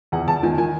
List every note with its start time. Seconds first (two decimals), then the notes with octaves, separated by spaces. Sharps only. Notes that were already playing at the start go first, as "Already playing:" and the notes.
0.12 E2 F#5
0.27 E2 A5
0.43 D#3 G#5
0.58 D#3 G#5